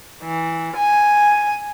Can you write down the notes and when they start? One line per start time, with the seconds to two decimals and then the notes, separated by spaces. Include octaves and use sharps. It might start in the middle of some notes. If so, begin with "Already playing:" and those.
0.24 E3
0.76 G#5